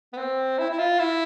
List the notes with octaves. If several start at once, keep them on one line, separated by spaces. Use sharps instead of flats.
B3
C4
E4
E4
F4
E4